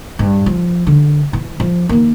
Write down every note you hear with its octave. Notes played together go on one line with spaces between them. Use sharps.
G2
F3
D3
E3
F3
D#3 A#3